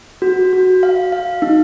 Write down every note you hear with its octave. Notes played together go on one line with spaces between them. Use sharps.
F#4
F#4
F5
F5
D#4